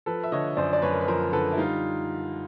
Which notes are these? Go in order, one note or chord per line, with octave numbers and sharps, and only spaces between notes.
F3 A4 B4
E5
D3 C#5 D#5
F#2 C5 D5
D5
F#2 B4 C#5
A#4
B4
F3 A#4 C5
D3 A4 B4
E4
G3 D#4 F4